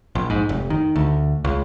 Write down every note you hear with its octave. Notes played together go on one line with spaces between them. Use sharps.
A#1
G#2
F1
D#3
D2
C#2